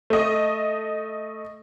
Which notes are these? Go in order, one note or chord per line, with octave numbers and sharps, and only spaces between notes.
A3 D#5